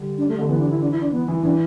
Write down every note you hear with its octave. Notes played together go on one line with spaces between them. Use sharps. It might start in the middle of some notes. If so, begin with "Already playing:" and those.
Already playing: D3 G3
D4
A3
D3 A3
E3 B3
D4
E3
E4
D4
E4
D4
E3 B3
E3
E3 D4